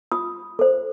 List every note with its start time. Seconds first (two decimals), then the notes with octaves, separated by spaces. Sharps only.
0.12 F4 D#6
0.59 A4 C5